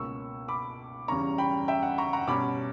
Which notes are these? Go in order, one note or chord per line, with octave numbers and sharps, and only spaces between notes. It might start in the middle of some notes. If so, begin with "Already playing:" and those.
Already playing: C#2 B2 A#3 C#4 C#6 E6
B5 D6
E2 C#3 G3 C#4 A#5 C#6
G5 B5
E5 G5
F#5
A#5 C#6
F#5 A#5
B2 G3 C#4 B5 D6